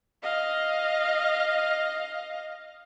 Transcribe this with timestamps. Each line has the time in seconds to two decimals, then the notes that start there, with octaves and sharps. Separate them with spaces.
0.23 D#5 F5